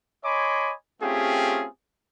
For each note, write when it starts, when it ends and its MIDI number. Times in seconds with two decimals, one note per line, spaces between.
0.24 0.73 73
0.24 0.73 75
0.24 0.73 80
0.24 0.73 83
0.24 0.73 84
0.24 0.73 86
1.01 1.67 57
1.01 1.67 60
1.01 1.67 61
1.01 1.67 65
1.01 1.67 67
1.01 1.67 68